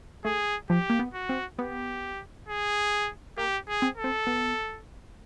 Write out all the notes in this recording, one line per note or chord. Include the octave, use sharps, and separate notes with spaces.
A3 G#4
F3 G4
A#3
B3
F#4
C4
B3 G4
G#4
A#3 G4
G#4
C4
A4
C4
B3